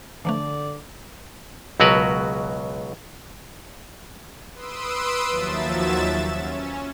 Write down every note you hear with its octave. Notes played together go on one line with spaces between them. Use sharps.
D3 E3 F3 A3 D5
C#2 B2 F#3 F#4 A#4 B4
B4 C6 D#6 E6 D7
D#2 F3 F#3 E5 A6 E7
C#4